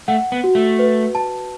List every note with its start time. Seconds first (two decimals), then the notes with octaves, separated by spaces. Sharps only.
0.08 A3 F#5
0.32 B3
0.44 F#4
0.55 A3
0.79 B4
1.15 A5